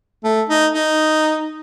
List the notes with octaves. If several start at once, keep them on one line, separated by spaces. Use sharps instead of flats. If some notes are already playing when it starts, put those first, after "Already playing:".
A3
D#4
D#4